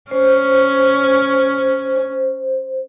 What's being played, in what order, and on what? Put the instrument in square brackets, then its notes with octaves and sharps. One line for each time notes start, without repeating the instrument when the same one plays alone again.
[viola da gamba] C#4 [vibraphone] C5